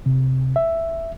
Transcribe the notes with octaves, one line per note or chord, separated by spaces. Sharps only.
C3
E5